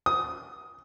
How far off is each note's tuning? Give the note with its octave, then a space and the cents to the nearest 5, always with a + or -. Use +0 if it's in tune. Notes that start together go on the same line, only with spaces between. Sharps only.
D#6 +10